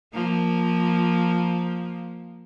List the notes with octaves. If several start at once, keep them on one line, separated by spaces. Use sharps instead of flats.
F3 A#3